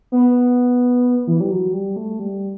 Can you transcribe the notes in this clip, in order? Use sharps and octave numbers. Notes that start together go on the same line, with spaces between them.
B3
E3
G3
F#3
G3
A3
G3